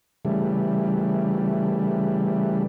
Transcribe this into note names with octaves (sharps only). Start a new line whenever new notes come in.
C#3 E3 G3 A3